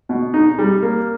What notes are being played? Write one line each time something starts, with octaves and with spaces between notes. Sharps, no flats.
B2
D#4
G3
A#3